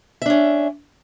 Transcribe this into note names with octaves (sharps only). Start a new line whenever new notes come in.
C#4 D4 E5